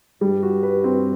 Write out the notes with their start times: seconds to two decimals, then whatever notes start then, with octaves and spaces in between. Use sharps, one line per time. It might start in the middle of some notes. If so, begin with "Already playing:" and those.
0.21 G2 G3
0.43 F#4
0.63 B4
0.84 C4